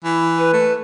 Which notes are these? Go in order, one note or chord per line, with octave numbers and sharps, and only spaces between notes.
E3
B4
A3